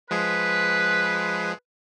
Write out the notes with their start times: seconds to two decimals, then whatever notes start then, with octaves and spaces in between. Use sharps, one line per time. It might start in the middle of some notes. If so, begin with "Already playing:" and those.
0.11 F3 G#3 G#4 B4